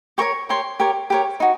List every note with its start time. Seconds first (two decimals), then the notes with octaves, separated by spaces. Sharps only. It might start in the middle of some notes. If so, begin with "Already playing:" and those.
0.18 G4 A#4 C#5 C#6
0.49 G4 A#4 C#5 C6
0.80 G4 A#4 C#5
1.10 G4 A#4 C#5
1.40 D#4 F#4